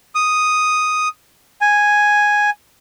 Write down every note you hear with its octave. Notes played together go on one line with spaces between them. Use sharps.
D#6
G#5